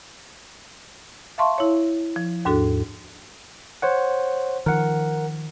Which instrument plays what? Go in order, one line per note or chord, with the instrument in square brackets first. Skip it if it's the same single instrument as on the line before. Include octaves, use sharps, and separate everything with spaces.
[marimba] E5 F5 A5 C6 C#6
E4 C#5
F3
D#2 G#2 D4 F#4 A4
[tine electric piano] C5 C#5 F#5
[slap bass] D#3 F3 [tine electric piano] A#4 F#5